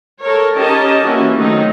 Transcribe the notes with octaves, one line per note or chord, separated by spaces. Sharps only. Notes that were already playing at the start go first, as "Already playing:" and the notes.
A4 A#4 C#5
C#4 D#4 G4 A#4 D#5 A5
E3 A#3 C#4 E4 F#4
D#3 F#3 A3 C4 D#4